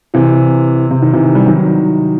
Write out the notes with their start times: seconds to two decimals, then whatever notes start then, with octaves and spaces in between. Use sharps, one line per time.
0.14 C3 E3
0.91 C3
1.02 D#3
1.13 C3 E3
1.35 G3
1.46 D#3 F#3